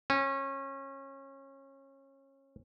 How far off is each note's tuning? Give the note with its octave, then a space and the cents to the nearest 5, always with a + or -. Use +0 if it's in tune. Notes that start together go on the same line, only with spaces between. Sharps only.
C#4 -25